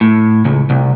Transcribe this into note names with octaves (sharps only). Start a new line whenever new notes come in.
A2
C#2
C2